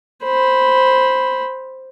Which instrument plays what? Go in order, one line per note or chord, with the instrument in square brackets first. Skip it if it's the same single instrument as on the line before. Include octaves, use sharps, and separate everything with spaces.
[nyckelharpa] C5 B5